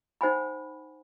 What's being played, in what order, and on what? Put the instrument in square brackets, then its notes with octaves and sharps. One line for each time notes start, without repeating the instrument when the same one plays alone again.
[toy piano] D#4 C5 F#5 G#5 B5